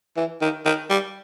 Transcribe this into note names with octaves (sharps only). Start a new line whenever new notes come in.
E3
D#3
D#3
G3